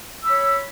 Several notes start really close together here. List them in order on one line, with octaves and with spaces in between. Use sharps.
E6 B5 C#5